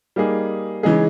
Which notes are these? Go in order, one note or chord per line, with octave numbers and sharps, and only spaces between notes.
G3 A#3 D#4 G#4
C#3 E3 G#3 D#4 G#4